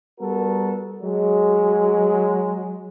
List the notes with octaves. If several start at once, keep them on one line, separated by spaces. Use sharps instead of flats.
G3 B3 F#4 A4 A#4
F#3 G#3